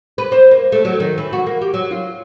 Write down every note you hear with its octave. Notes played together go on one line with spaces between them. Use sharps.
B4
C5
A#3
A3
F#3
D#3
E3
F#4
A#3
G4
F#3
F4